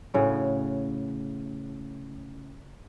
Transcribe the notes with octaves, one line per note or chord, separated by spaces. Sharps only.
A2 C#3 F#4